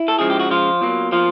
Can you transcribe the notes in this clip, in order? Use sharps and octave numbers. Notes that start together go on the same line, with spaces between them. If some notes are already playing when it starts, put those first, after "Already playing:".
Already playing: E4
A4
C#3 F3 G#3 G#4
G4
F#4
F3 F4
B2 F#3 A#3
F3 F4